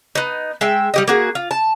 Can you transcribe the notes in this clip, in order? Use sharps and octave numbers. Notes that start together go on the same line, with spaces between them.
B3 D#4
G#3 E5 G5
G3 G4 D#5
A#3 F#4 G#4
F4
A5